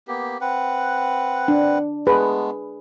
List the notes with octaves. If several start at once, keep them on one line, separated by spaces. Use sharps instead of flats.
A#3 B3 G4
C4 B4 F#5
D4
G#3 A3 B3 G#4 B4